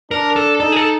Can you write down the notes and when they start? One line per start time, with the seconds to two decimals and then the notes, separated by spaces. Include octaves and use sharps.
0.11 D4 A#4
0.36 A4
0.60 D#4 A4
0.72 G#4
0.76 A4